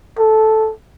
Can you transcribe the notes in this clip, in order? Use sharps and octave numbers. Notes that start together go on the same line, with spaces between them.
A4